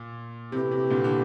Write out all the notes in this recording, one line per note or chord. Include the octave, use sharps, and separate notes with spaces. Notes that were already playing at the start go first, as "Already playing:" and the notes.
Already playing: A#2
C3 E3 A3 C4 E4 G4
C3
A#2 D3
D3